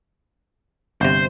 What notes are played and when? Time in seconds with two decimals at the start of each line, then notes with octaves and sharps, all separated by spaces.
1.01 G1 C3 C5